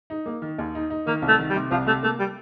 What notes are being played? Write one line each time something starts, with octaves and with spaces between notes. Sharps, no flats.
D#4
A#3
D#3
D#2
D#4
D#4
D#3 A#3
C2
A3
D#3
G3
C3
C2 F3
C3 A3
A3 A#3
G3